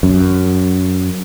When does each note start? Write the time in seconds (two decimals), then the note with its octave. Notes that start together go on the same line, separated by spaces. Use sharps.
0.03 F#2